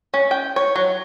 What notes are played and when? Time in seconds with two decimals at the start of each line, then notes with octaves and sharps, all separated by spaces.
0.14 C#4
0.31 G5
0.56 C#5
0.76 F#3